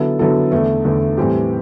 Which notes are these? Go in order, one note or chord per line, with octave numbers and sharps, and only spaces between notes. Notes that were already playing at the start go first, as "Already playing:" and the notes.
Already playing: D3 F#3 B3 E4 A4
D3 F#3 B3 E4 A4
E2 D3 A3
E2 D3 A3
A2 E3 G3 C4 G4